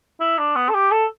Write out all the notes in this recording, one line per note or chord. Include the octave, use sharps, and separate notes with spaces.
E4
D4
B3
A4
G4
A4